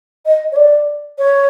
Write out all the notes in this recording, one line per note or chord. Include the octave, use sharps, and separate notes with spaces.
D#5
C#5
D5
C#5